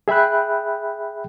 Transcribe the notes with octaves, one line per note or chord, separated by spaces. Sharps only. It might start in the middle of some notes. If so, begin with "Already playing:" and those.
G#4 E5 G5 B5 F#6